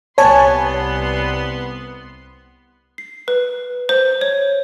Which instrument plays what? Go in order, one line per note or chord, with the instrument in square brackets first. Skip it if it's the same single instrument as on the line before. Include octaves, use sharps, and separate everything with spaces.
[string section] C2 B3 C6 [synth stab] C#5 G#5 A5
[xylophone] C7
B4
C5
C#5